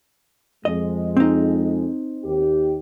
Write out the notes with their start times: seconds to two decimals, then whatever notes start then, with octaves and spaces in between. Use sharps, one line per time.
0.65 F2 G#3 D#5
1.17 C4 D#4
2.24 D#2 G4